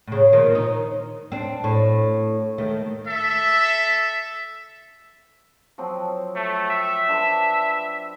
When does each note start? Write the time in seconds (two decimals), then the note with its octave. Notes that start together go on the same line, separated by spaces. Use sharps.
0.07 A2 C#3
0.32 A#2 D#3 F3
0.55 D#4
1.32 C4 D4
1.64 A2
2.58 D#3 A3
3.07 A4 E5
5.78 F3 F#3 C4
6.36 A3
6.70 E5
7.09 D4 B4 C6